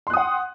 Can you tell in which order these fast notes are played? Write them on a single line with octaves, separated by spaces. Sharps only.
C6 F#6 D#6 F#5 G5